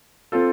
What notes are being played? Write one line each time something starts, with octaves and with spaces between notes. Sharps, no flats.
C4 F4 A4